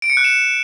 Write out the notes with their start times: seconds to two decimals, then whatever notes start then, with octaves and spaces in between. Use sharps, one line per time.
0.02 D7
0.10 C#7
0.17 F#6
0.24 E7